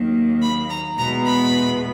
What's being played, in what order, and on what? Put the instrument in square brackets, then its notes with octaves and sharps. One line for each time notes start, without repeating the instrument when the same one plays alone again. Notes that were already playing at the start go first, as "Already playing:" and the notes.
Already playing: [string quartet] D#2 D#3 F#3 A#3
B5
A#5
E2 B2 G#3 B3 A#5
B5